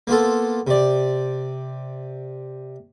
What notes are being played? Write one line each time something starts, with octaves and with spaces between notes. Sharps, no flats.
A#3 B3 F4 A4
C3 D5